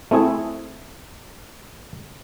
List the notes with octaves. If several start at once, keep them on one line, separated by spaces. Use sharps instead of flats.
A3 C4 E4 G#4